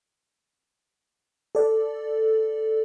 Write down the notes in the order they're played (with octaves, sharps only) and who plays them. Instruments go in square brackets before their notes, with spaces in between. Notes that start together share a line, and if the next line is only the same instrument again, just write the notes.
[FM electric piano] A4 D5